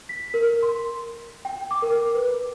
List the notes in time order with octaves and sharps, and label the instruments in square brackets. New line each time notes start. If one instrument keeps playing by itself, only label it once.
[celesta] B6
A#4
C6
G5
D6
A#4
B4